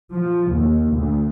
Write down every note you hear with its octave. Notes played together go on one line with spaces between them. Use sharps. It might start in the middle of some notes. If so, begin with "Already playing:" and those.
F3
D#2
D2